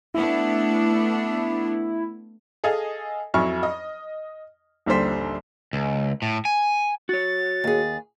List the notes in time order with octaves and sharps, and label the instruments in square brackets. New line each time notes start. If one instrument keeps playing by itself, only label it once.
[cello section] A3 B3 D4 [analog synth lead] E4
[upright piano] G#4 A4 D#5 F5 G#5
F2 F#3 E4 G#5 C#6 F6
D#5
D#1 A#1 D3 G3 C5 B6
[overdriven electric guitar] C#2
A2
G#5
[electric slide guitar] F#4 C#5 [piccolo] A6
[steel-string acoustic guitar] D#2 G#4